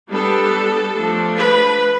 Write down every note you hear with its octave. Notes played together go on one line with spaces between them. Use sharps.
G3 B3 D4 A4
F3 A3 D4
B4